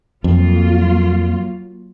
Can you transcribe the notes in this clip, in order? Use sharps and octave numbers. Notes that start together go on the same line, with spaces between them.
F2 F#3 A#3 F4